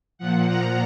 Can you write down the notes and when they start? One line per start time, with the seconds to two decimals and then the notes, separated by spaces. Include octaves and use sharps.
0.18 A#2 F3 F#5
0.48 A#5